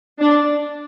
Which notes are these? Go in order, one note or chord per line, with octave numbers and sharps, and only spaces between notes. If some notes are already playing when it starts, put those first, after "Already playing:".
D4